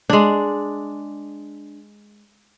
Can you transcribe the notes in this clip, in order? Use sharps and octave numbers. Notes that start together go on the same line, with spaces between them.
G#3 D4